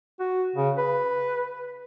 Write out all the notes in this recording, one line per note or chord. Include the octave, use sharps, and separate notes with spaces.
F#4
C#3
B4